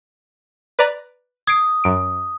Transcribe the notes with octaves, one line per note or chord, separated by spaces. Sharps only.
B4 D5 A#5
D#6 G#6 C7 D7
F#2 D7